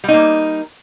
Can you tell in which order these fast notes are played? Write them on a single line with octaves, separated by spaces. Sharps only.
G3 D#4 A#3